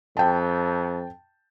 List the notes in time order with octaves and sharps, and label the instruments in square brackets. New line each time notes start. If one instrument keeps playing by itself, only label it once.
[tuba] F2 [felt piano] G5 A5